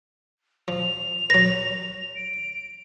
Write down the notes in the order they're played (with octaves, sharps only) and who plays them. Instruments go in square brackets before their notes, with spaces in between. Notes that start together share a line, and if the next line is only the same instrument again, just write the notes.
[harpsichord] F3 [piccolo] F7
[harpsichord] F#3 B4 [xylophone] A#6
[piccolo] D7